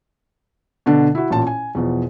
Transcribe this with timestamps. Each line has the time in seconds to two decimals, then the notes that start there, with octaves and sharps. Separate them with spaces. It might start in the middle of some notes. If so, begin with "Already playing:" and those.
0.86 B2 D3 D4
1.15 E4 F#4
1.30 A1 A#2 A5
1.47 G#5
1.75 E2 B2 F3